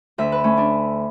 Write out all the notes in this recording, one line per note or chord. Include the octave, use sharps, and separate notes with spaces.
D2 E5
B4
A3 C#4
D4